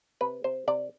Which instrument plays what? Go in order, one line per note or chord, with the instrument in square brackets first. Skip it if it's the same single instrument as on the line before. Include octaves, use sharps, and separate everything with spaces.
[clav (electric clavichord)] C3 B4
C3 C5
C3 D5